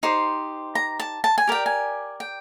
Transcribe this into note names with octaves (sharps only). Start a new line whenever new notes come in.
D#4 G4 C5 C6
A#5
A5
A5
G#5
G4 A#4 D5 G5
G#5
G5